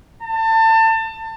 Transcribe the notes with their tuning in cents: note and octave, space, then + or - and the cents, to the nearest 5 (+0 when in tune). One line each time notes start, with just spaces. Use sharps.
A5 +30